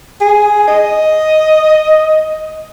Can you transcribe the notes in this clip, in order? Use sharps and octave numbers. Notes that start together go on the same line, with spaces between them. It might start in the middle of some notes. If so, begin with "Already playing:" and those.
G#4
D#5